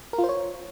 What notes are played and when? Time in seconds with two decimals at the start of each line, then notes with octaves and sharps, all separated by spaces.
0.13 A#4
0.18 F4
0.24 C5
0.29 C#5